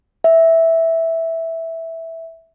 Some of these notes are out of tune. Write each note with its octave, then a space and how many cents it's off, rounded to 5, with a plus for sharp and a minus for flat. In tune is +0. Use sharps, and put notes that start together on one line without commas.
E5 -5